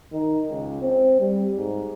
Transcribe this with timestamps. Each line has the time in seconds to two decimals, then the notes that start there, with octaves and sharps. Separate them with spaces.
0.13 D#3
0.50 C#2
0.82 C4
1.20 G3
1.57 G#2